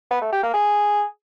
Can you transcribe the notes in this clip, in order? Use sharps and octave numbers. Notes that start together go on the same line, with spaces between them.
B3
A3
G4
A#3
G#4